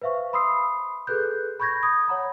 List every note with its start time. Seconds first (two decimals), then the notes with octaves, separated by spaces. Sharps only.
0.02 B4 C5 E5 F5 C#6
0.33 B5 C6 D#6 E6 C7
1.07 G#4 A4 B4 F#6 G6
1.60 B5 C#6 G6 G#6 A#6
1.83 D#6 G#6
2.08 C#5 F#5 A#5 B5